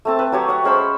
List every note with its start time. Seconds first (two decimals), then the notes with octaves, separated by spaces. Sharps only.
0.05 A3 C4 A5
0.19 B4
0.32 F#3 G4 C#5
0.48 C#5 F#5
0.64 G#3 C#4 C5 B5